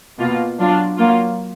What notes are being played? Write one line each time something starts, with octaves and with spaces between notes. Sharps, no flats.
B2 A#3 F4
F#3 D4 F4
F#3 A#3 F4